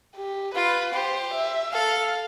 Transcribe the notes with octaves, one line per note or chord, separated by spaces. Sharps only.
G4
F4 B4
G4 C5
E5
A4 F5